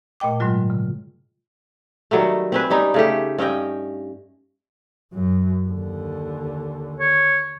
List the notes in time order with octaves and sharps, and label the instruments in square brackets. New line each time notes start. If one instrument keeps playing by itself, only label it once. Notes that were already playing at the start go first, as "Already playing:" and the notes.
[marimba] A#2 A3 D#5 G5 D6
G#2 D3 F#3 G#3 F4
C#3
[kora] D#3 F#3 G3 A3
C4 C#4 B4
G3 C#4 D#4
C#3 A3 G4
G2 C#4 D#5 G5
[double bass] F#2 F#3
D#2 D3
[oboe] C#5